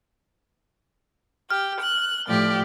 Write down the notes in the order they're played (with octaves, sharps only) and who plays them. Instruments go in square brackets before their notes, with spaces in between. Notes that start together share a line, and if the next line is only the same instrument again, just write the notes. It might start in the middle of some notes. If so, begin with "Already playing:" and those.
[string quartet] G4 [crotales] F6
[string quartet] F#6
[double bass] A2 [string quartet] F3 G4 D5